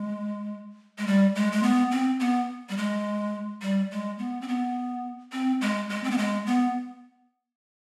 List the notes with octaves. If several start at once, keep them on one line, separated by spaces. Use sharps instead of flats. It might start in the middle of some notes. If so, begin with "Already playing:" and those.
Already playing: G#3
G#3
G3
G#3
G#3
B3
C4
B3
G3
G#3
G3
G#3
B3
C4
B3
C4
G#3
G#3
C4
B3
G#3
B3